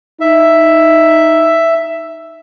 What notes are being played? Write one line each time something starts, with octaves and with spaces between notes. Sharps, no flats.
D#4 E5